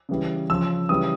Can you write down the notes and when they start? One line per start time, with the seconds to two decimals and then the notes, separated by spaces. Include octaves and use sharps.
0.09 C#3 E3 G3
0.50 C#3 F3 E6
0.89 C#3 E3 G3 D#6